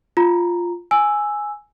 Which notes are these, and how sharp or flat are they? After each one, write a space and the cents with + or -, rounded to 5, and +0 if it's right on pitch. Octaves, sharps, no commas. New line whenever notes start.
F4 +0 A#5 +0
G#5 +5 E6 +0